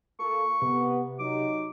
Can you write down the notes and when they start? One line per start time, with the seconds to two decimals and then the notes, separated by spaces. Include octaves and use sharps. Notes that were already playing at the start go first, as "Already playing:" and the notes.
0.20 A#3 F4 A4 C#6
0.62 C3 B3
1.19 F#3 D#4 D6